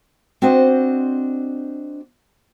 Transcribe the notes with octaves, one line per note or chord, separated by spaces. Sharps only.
C4 D4 F#4 C5 D#5